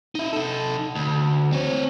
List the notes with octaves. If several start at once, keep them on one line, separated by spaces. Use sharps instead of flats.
D#4 E5
D#4 A4
D2
C4 C#5